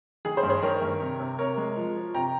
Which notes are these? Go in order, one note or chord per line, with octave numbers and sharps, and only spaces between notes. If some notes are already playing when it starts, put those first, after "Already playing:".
D#3 G#4
G#4 C5
G2
G#4 C5
D#3 A#4 C#5
G2
C3
C3
C3 A#4 C#5
G#3
F3
F3
C3 G5 A#5